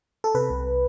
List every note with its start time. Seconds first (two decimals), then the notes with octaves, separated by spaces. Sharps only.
0.24 A4
0.35 C3 B4
0.50 C2